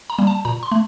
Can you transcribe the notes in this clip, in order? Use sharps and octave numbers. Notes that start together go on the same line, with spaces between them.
A#5
G3 A#3
A5
A#2 A#5
C6
A3